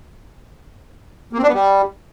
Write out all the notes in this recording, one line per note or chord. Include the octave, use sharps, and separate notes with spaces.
A#3
C4
D4
B3
G3